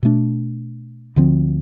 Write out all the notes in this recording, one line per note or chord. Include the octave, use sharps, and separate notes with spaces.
B2 A3 D4
D2 D3 F3 C4